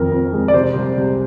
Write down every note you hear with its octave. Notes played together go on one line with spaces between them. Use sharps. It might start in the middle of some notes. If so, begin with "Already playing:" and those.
Already playing: F2 D#3 A#4
F2
G#3
D5
C3 C5
C2
C2